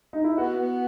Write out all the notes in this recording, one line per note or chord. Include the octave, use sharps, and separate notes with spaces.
D#4
E4
B3 F#4
B3